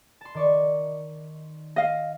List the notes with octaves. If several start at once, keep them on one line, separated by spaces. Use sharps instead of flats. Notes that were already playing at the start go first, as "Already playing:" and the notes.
A5 C6
D#3 D5 C#6
D#5 F5